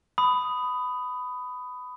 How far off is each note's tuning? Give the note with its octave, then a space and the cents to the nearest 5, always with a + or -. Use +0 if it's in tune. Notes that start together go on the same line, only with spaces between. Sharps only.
B5 +15 D#6 +0